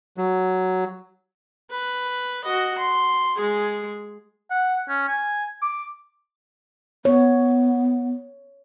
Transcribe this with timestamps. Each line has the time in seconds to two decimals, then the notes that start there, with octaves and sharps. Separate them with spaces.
0.17 F#3
1.71 B4
2.44 F#4 D#5
2.78 C6
3.36 G#3 G#4
4.50 F#5
4.89 C#4
5.08 G#5
5.62 D6
7.05 B3 C#5